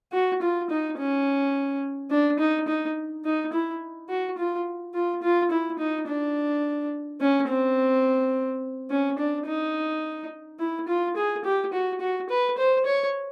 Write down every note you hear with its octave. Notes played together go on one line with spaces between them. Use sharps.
F#4
F4
D#4
C#4
D4
D#4
D#4
D#4
E4
F#4
F4
F4
F4
E4
D#4
D4
C#4
C4
C#4
D4
D#4
E4
F4
G#4
G4
F#4
F#4
B4
C5
C#5